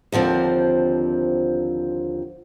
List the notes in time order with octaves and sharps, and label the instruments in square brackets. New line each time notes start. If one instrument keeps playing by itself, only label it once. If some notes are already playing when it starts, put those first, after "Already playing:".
[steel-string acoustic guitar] D#2 D3 F3 C4